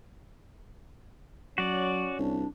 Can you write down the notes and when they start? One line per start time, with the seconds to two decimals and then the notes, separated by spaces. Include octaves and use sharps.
1.58 F#3 C#4 F#4 D5
2.19 C2 D4